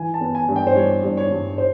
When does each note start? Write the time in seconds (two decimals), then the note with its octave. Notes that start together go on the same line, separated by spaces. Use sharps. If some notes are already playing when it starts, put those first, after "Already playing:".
Already playing: E3 G#5
0.14 A5
0.21 B3
0.35 G#5
0.48 G2
0.56 G5
0.67 C5
0.76 G3 C#5
1.03 G2
1.17 C#5
1.31 G2
1.58 C5